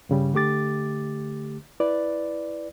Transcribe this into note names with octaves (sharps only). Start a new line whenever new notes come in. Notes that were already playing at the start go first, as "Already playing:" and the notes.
G2 C#3 G3
D3 A3 G4 D6 A6
E4 B4 D5